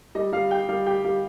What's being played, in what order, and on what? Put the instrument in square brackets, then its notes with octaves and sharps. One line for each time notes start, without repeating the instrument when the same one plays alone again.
[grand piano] G3 [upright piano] D#5
[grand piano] G3 [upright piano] F5
[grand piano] G4 [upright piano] G5
[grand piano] G3 [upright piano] F5
[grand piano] G4 [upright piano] G5
[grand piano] G3 [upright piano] F5